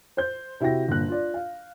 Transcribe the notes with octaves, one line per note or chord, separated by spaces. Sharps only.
C5 G6
C3 E4 F#4 G5 A#6
G1 A#2 F#6
F4 D5
F5